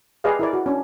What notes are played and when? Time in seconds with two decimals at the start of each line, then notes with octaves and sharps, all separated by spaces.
0.24 G4 G#4 B4 D5 D#5 F5
0.39 E4 A#4 D5
0.53 F#4
0.66 C#4 D4